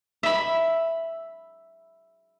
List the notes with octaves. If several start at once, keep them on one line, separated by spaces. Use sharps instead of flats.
E5 B5